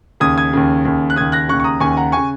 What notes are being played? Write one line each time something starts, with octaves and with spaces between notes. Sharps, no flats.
D#2 C#3 D#6 G#6
D#6 G#6
D#2 C#3
D#2 C#3
F#6
D#2 C#3 D#6 G#6
F#6 A#6
D#2 C#3 C#6 F#6
C#6
A#5 D#6
D#2 C#3 G#5 C#6
F#5 A#5
C#3 G#5 C#6